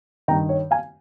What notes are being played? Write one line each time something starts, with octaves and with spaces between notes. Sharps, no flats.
G2 D#3 G5 A#5
C#5
F5 G#5